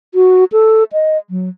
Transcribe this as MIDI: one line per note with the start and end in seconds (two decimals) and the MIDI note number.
0.15 0.45 66
0.52 0.84 69
0.93 1.18 75
1.30 1.49 54